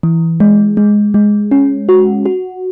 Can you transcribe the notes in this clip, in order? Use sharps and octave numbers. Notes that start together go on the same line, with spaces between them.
E3
G#3
G#3
G#3
C#4
F#4
F#4